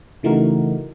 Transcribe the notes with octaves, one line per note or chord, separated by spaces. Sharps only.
C#3 E3 A3 D#4 F#4 A#4